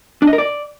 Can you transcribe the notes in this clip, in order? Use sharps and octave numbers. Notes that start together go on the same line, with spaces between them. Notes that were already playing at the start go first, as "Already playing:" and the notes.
D4
D#5
A#4
D5